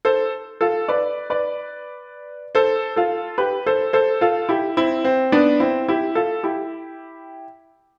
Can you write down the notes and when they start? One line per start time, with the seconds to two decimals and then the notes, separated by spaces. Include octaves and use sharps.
0.05 A4 C5
0.61 F4 A4
0.88 B4 D5
1.30 B4 D5
2.55 A4 C5
2.96 F4 A4
3.38 G4 B4
3.66 A4 C5
3.93 A4 C5
4.21 F4 A4
4.49 E4 G4
4.77 C4 E4
5.04 C4
5.32 B3 D4
5.60 C4 E4
5.88 E4 G4
6.15 F4 A4
6.43 E4 G4